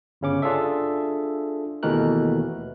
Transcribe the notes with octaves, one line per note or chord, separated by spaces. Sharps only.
G1 C#3 C#4 D6
D4 F4 G#4 A4 E5
D#2 B2 E3 A3 A#4 F#6